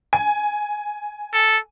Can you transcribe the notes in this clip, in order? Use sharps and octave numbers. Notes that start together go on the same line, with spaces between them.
G#5
A4